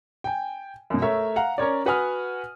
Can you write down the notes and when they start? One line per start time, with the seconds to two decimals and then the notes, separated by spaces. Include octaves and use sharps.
0.24 G5 G#5
0.90 F#2 B2
1.02 A3 A#4 C#5 E5
1.36 F5 F#5 A#5
1.58 C#4 A#4 C#5 D5
1.86 F#4 B4 F#5 G#5 D#6 F6